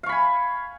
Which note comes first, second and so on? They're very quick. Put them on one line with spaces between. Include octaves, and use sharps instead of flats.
F5 C#6 B5 G#5